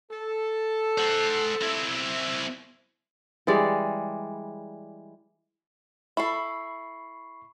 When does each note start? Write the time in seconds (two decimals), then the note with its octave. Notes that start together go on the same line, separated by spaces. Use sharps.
0.11 A4
0.98 C5 F#5
1.61 C4 E4
3.47 E3 G3 G#3 D5
6.17 E4 A4 B5 C#6 C7